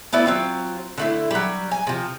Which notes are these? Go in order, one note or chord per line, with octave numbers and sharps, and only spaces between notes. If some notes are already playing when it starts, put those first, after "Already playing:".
A3 B3 E4 D5
F#3 C4 F4
D3 A3 E4
F#3 G3
G#5
C3 F3